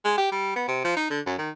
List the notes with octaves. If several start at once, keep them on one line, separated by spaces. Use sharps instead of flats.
G#3
G4
G3
B3
C3
F3
D#4
D3
F#2
D#3